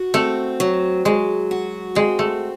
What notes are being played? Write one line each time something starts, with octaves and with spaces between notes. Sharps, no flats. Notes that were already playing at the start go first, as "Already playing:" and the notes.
Already playing: F#4
A3 C4
F#3
F#3 G#3
F#4
G#3 C4
A3